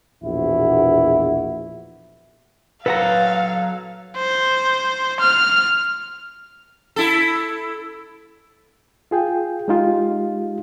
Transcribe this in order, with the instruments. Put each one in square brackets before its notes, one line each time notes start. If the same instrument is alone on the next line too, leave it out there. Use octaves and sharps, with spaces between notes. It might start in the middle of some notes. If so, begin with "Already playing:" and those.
[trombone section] A#1 E2 B2 E4 F#4
[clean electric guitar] F#3 A4 [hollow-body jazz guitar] B4 F#5 A#5 [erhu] F5
[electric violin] C5
F6
[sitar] E4 A4
[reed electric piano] F4 G#4 G5
G#3 D#4 F4 G4